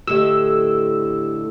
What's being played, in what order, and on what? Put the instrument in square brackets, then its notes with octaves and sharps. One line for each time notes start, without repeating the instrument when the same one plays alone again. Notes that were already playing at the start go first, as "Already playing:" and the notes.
[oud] A2 D3 [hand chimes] G4 D#5 [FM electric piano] E6